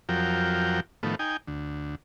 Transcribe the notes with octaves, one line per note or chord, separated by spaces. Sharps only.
F2 F3 F#3 A#4 G5
A2 D#3 F3 A3 B3
D#4 G5 G#5
D2